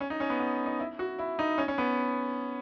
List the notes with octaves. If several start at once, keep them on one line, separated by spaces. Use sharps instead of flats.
C#4
D#4
C#4
B3
B3
D#4
E4
F#4
E4
D#4
C#4
C#4
B3